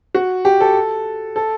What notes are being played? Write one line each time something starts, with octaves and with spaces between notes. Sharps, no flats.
F#4
G4
A4
A4